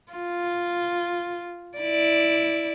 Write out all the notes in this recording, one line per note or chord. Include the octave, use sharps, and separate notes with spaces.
F4
E4 D5